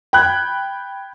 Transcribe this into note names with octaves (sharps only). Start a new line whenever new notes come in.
G5 B5 F#6 G#6